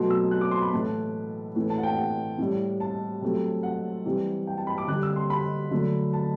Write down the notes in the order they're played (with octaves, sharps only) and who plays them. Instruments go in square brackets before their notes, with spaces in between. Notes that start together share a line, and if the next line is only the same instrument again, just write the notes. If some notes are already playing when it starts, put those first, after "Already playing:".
Already playing: [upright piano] B2 F#3 A3 C6
E6
F#6
D6
C6
B5
A2 E3 A3 A5
A2 E3 A3
A5
F#5
G5
F#5
A2 G3
A5
C3 F#3 A3
F#5
C3 E3 G3
G5
A5
B5
D6
D3 G3 F#6
E6
C6
B5
D3 F#3 A3
A5